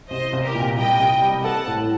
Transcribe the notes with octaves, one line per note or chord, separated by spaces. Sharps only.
C2 C5 D#5
C2
G4 A#4
A#2
G3 D#5 G5
C2
G3
A4 F#5 A5
A2